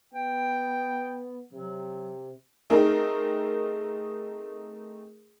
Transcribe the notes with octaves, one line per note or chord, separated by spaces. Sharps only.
B3 G5
C3 F#3
A3 C4 D#4 G#4 A#4